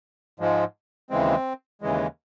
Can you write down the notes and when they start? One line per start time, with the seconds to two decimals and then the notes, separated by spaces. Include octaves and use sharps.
0.40 G#2 F3 G#3
1.10 D#2 C#3 E3 G#3 C4
1.82 D#2 C#3 E3 G#3